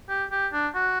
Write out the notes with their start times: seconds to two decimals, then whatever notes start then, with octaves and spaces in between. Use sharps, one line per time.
0.09 G4
0.32 G4
0.53 D4
0.75 F#4